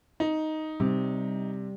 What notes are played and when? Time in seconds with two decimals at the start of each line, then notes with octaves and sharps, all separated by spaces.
0.20 D#4
0.80 C3 G3